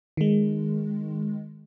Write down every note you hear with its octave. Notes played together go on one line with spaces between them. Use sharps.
D#3 G#3